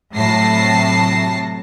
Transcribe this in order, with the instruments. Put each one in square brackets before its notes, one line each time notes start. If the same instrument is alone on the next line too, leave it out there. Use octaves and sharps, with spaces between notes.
[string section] A2 C3 F#3 A5 A#6 C7